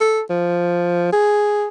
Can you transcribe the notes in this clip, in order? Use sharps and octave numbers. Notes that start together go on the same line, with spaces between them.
A4
F3
G#4